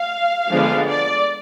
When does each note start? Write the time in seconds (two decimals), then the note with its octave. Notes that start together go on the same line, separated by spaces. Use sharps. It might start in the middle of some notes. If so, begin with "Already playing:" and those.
Already playing: F5
0.49 D3 F3 G#3 B3 D4
0.86 D5